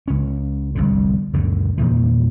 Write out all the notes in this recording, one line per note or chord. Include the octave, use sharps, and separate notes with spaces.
C#2 C#4
G1 C2 F2 D3
C#2 F#2 A#2 D3
E2 A#2 D#3 E3